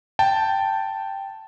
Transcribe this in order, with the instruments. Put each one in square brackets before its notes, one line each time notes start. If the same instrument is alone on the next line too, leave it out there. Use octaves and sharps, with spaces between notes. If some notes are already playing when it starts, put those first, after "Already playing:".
[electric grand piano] G5 A5